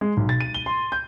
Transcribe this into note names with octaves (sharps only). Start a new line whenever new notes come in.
G#3
B1
A6
D#7
G7
C6
G6